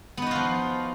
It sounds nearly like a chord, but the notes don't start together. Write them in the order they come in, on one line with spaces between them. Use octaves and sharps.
B3 D#4 F#4 F4 F3